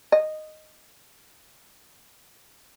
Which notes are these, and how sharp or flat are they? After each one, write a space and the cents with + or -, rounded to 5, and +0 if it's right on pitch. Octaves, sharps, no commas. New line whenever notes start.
D#5 -10